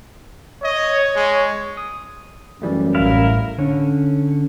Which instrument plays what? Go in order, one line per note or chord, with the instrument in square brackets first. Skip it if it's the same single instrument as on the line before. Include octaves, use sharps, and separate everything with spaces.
[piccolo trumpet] C#5 [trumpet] D#5
[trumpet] G#3
[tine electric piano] D#6
[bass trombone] F#2 [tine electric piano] E3 G3 A3
[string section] A1 A#4 [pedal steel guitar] E4 F5
[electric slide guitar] D3 C#4